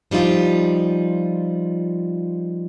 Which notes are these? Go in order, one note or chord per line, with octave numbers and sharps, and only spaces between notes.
F3 G3 D#4 F4